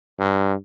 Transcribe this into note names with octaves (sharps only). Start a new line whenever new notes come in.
G2